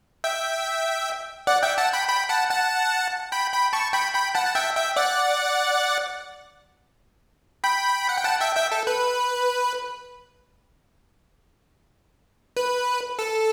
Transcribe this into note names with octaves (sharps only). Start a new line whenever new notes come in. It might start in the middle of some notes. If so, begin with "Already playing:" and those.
E5 G5
D5 F#5
E5 G5
F#5 A5
G5 B5
G5 B5
F#5 A5
F#5 A5
G5 B5
G5 B5
A5 C#6
G5 B5
G5 B5
F#5 A5
A5
E5 G5
E5 G5
D5 F#5
G5 B5
F#5
G5
F#5 A5
E5 G5
E5 G5
A4
B4
B4
A4